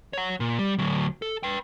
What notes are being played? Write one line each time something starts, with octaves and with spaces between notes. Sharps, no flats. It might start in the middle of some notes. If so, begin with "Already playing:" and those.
C#5 F#5
A#2
G3
D2 F#3
A4
B4 G5